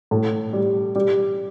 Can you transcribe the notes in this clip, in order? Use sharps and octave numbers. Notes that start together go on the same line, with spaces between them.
A2
G3
G3